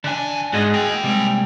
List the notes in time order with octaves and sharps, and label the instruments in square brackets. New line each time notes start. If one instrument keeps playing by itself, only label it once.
[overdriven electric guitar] D3 G#5 [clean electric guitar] D4
[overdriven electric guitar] G#2 [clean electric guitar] F#4 G#4 D#5
[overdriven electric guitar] A#3 G5
[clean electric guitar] C3 G3 G#3